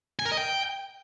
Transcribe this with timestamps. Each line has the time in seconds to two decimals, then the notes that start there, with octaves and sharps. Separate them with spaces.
0.19 G#5
0.25 A#4
0.31 D#5
0.37 G5